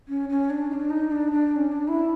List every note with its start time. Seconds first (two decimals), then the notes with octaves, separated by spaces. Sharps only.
0.08 C#4
0.29 C#4
0.50 D4
0.70 D#4
0.73 D4
0.90 D#4
1.12 D4
1.32 D4
1.52 D4
1.56 C#4
1.72 D4
1.88 E4